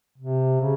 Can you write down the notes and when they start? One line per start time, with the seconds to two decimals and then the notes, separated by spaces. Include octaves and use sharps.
0.18 C3
0.60 C#3